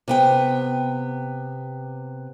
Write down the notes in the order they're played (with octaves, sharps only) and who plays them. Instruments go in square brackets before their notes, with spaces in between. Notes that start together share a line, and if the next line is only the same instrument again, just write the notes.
[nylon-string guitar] C3 B3 G5